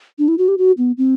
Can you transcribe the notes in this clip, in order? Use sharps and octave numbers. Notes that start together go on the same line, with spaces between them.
D4
E4
F#4
G4
F#4
B3
C4